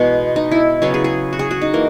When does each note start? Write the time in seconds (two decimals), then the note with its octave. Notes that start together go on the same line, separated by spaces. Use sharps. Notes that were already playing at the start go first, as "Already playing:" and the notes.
Already playing: B2 E3 G#3 B3
0.36 D#4
0.51 E4
0.82 C#3 F#3 B3 G#4
0.94 G#4
1.04 G#4
1.33 F#4
1.39 G#4
1.51 F#4
1.62 D#4
1.73 E3 A#3